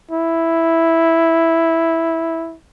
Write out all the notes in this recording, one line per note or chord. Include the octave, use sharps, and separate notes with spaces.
E4